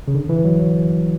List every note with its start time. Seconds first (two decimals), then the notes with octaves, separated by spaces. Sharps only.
0.08 C#3
0.14 D3
0.29 E3
0.44 F#3
0.59 F#3